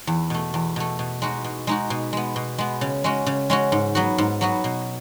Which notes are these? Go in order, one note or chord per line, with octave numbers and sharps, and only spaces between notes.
E2
B2 A3
E2
B2 A3
B2
G#3 D#4 F#4
B2
G#3 D#4 F#4
B2
G#3 B3
B2
G#3 B3
C#3
G#3 C#4 F#4
C#3
G#3 C#4 F#4
G#2
F#3 B3 F#4
G#2
F#3 B3 F#4
B2